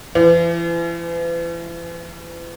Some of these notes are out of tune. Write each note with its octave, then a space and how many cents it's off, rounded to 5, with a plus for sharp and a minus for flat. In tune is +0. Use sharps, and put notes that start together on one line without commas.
E3 +40